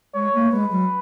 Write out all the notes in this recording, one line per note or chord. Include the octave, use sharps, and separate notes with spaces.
G#3 C#5
A#3
G#3 B4
F#3